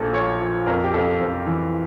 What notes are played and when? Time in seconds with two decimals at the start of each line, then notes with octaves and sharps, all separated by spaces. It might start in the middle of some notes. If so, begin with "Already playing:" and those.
Already playing: A#1 A#2 A4
0.13 F3 C#5
0.40 F3
0.66 F2 A#4
0.84 G4
0.93 F2 A4
1.20 F2
1.46 E3